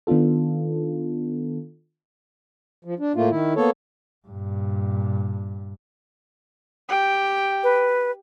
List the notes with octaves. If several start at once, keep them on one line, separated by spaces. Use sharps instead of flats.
D#3 B3 D4 F4 A4
F3
D4
A2 A3 A#3 F4
D#3 E4
A#3 B3 A4 C#5
G2 A#2
G4 G5
B4